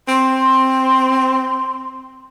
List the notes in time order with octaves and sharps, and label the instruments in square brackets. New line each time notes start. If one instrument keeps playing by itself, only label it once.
[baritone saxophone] C4 [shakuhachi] C6